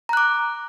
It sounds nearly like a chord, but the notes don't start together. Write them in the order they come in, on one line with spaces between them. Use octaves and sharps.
A#5 F#6 D6